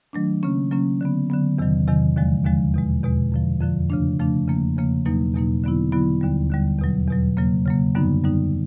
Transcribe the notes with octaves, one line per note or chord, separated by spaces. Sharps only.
D#3 F#3 A3 D4
C#3 F#3 A#3 C#4
C#3 F#3 A#3 C#4
D3 F#3 B3
D3 F#3 B3
E2 C3 D#3 F#3
E2 C3 D#3 F#3
D#2 D3 F3 G#3
D#2 D3 F3 G#3
E2 B2 G#3
E2 B2 G#3
F2 D3 F3
F2 D3 F3
C#3 F3 A3 D4
C#3 F3 A3 D4
E2 C#3 F3 A#3
E2 C#3 F3 A#3
E2 B2 F#3 A#3 D#4
E2 B2 F#3 A#3 D#4
D3 F#3 B3 E4
D3 F#3 B3 E4
D#2 D3 G3
D#2 D3 G3
E2 B2 F#3
E2 B2 F#3
C#3 F#3 A#3
C#3 F#3 A#3
F#2 D3 G3 B3 D#4
F#2 D3 G3 B3 D#4